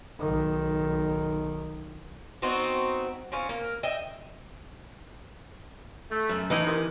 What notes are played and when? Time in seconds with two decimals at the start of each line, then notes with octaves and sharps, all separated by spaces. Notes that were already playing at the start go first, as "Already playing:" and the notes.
0.19 B1 D#3
2.42 B3 C4 D#4 F#4
3.32 C4 C#4 F4
3.49 A#3
3.83 D#5 E5 G5
6.11 A3
6.29 F#2
6.50 A2 E3 D#4
6.67 C3 D#3